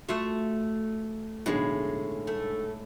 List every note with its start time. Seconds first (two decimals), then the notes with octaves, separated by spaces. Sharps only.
0.09 A3 F4 F#4 E5
1.46 B1 A2 D3 G#3 G#4
2.27 A3